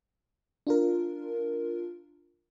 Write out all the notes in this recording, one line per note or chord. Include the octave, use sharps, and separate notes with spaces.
D4 F4 A#4